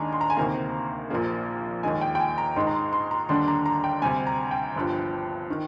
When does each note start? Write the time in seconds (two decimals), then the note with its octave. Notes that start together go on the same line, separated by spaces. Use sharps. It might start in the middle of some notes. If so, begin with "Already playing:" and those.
Already playing: D#2 D#3 G#3 D4 G#5 A#5
0.13 C6
0.21 A#5
0.30 G#5
0.37 D2 C3 D#3 A#3 A#5
1.10 A#1 A#2 F3 A#3
1.83 D#2 D#3 G#3 G#5
2.01 G5
2.15 G5
2.20 G#5
2.38 A#5
2.56 G#2 D#3 G#3 D#4 C6
2.67 A#5
2.75 C6
2.93 C6
3.11 A#5
3.29 D#2 D3 G3 D4 C6
3.48 A#5
3.66 A#5
3.84 G5
4.02 D2 C3 G3 G#5
4.27 A#5
4.51 G5
4.76 G1 G2 F3
5.50 D#3